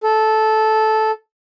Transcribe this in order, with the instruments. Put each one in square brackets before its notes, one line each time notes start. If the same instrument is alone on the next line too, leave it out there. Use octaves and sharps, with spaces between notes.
[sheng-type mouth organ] A4